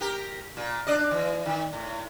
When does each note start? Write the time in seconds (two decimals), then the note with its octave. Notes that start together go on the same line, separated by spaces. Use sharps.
0.01 G4 A#4
0.57 A#2
0.87 D4 D5 D#5
1.11 E3
1.46 D#3
1.73 A2